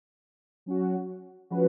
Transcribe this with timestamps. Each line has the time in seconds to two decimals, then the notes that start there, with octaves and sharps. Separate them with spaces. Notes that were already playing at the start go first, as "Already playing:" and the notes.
0.66 F#3 C#4 F#4
1.50 F3 G#3 C#4 F#4 B4